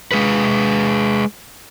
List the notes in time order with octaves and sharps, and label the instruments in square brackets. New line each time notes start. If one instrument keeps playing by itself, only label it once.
[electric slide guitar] G#3 G#4 B4